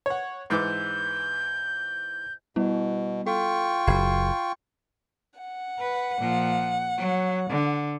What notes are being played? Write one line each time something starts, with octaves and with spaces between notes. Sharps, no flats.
C#5 F#5
G#2 E3 D6 G6
B2 G3 B3 E4
F4 A4 G5 C#6
F#1 B5 G#6 C7
F#5
B4
A#2 F3
F#3
D3